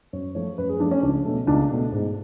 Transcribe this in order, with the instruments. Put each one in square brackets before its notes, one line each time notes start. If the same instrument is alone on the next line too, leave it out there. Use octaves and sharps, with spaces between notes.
[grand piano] F#2 C#5
F3 A3 C#5
F#2 B4
G#4
F3 A3 D4
C#4
C#2 D4
B2 A3
C#2 D4
B2 A3
G#2